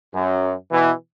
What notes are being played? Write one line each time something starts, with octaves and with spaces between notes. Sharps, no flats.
F#2
B2 E3